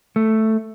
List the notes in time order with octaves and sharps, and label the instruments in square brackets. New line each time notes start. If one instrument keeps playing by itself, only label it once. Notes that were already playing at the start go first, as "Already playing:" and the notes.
[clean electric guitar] A3